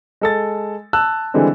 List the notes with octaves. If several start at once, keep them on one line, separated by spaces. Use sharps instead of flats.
G#3 A4 A6
A5 E6 F#6
D3 E3 G3 G#3 C4